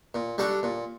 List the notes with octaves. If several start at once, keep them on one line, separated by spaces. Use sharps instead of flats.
A#2
G3 D4 F#4 A4
A#2